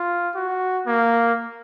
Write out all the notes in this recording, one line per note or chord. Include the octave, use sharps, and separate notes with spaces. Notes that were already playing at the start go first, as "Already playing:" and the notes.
Already playing: F4
F#4
A#3